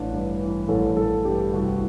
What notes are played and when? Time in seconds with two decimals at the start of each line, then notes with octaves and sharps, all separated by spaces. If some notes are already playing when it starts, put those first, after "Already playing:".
Already playing: A1 D4
0.12 G2
0.40 E3
0.68 A1 A4
0.97 A1 A4
1.25 G2 G4
1.54 C2 F#4